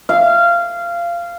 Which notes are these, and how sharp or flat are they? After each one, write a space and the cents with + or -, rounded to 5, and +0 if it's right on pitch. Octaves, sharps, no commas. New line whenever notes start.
F5 -20